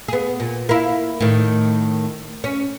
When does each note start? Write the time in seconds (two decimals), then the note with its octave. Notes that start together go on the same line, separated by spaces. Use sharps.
0.08 B3 G#4
0.40 A#2
0.69 A#3 E4
1.20 A2 D#3
2.44 C#4